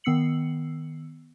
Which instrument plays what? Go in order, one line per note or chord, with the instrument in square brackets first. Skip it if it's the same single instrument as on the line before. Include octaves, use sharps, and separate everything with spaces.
[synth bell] D#3 B3 E6 C7 C#7 F#7